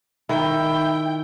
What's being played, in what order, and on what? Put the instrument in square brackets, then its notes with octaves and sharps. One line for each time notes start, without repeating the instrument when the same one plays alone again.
[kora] D#3 [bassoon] E4 [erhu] G5